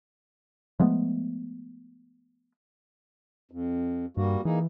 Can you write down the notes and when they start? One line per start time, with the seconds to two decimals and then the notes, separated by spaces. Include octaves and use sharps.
0.80 F3 G#3 A3 B3
3.51 F2
4.17 G2 G3 A#3 F#4
4.45 E3 A#3 D#4 G#4